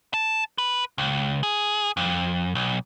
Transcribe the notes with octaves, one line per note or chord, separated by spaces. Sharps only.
A5
B4
C#2
G#4
F2
B1